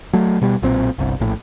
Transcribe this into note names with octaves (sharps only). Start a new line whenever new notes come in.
F#3 A3
B2 G3
B1 A#2 C4
G1 C2
A#1 A2